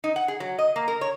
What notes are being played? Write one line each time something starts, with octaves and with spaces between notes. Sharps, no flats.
D#4
F#5
G#4
F#3
D#5
A#3
A#4
C#5